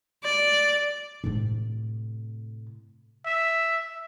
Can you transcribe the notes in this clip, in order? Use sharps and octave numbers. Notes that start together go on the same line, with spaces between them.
D5
A2 C3
E5